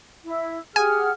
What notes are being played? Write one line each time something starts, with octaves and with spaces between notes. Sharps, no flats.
E4
G4 G#4 F#5 G#5 F6